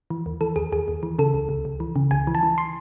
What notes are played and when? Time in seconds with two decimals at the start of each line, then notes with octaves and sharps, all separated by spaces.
0.10 E3
0.26 D#2
0.41 E3 A4
0.56 D#2 G#4
0.72 D#2 G#4
0.88 D#2
1.03 E3
1.19 C#3 A4
1.34 C#2
1.49 C#2
1.65 C#2
1.80 E3
1.96 C#3
2.11 C#2 G#5
2.27 E3
2.35 A5
2.43 E3
2.58 C6